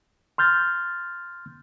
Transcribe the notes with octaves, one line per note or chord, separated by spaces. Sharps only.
C6 F6 G6 A6